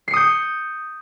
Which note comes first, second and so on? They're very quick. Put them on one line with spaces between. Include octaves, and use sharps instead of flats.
C7 C#7 D#6 G6